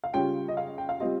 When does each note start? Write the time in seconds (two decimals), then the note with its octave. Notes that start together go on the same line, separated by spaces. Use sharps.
0.04 F5
0.13 C#3 G3 C#4 F4 G5
0.48 D#5
0.57 F5
0.78 G5
0.89 F5
1.00 G3 C4 F4 D#5